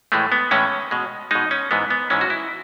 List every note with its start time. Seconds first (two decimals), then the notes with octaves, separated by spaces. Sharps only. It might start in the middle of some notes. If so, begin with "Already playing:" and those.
0.12 A2 E3 G#3 A3
0.32 B3
0.51 A2 E3 G#3 C#4
0.91 B2 G#3
1.31 B2 G#3 D#4
1.51 C#4
1.71 G#2 E3 G#3 B3
1.90 B3
2.10 G#2 E3 G#3 C#4
2.21 F#4
2.30 E4